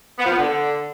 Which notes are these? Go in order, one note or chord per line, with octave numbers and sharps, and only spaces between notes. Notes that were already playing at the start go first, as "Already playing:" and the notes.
B3
F3
B3
D3